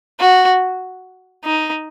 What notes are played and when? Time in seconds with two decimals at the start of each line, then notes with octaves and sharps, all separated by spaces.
0.20 F#4
1.44 D#4